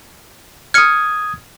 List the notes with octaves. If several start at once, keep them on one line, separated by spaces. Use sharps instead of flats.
D#6 F6 G#6 C#7